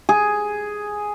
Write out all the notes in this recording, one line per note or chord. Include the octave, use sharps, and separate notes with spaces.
G#4